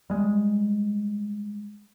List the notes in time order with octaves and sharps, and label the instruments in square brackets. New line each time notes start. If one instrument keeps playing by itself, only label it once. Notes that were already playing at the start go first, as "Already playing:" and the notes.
[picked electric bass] G3 G#3